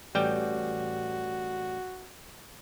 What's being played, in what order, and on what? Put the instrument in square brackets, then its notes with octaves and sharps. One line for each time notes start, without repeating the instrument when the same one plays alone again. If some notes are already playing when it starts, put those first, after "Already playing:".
[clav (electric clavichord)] A1 G3 G5 [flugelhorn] F#4